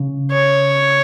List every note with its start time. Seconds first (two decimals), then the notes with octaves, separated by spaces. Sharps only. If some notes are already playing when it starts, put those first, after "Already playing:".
Already playing: C#3
0.31 C#5